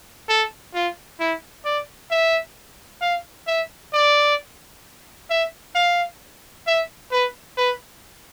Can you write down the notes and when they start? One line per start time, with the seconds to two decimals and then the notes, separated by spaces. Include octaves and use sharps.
0.29 A4
0.74 F4
1.20 E4
1.65 D5
2.11 E5
3.01 F5
3.47 E5
3.93 D5
5.30 E5
5.75 F5
6.67 E5
7.11 B4
7.57 B4